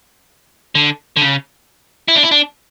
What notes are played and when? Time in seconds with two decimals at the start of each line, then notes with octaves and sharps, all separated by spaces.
0.75 D3
1.16 D3
1.21 C#3
2.08 E4
2.16 D4
2.23 E4
2.31 D4